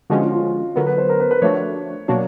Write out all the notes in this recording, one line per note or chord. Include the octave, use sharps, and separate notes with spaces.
D3 F3 G#3 C#4 F#4
F4
F4
D3 F#3 B3 A#4
B4
C5
A#4
B4
B4
F3 A3 D4 F#4 C#5
B2 F#3 A#3 D4 F#4 C#5